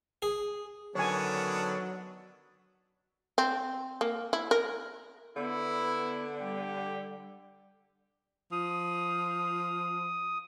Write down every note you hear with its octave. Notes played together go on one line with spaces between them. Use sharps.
G#4
D3 D#3 F#3 B3 C#4 D4 C#5 G#5
C4
A#3
E4
A#4
D3 B3 E4
G3 G4
F3 D#6